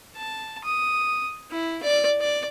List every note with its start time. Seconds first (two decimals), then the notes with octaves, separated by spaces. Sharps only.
0.16 A5
0.65 D#6
1.51 E4
1.82 D5
2.20 D5